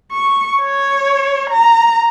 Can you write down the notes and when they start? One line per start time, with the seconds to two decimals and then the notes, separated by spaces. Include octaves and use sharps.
0.12 C#6
0.62 C#5
1.50 A#5